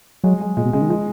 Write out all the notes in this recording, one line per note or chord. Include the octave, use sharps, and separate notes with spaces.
F#3 G#3
G#3
A#2 G#3
B2
C#3 G#3
D#3
F3 G#3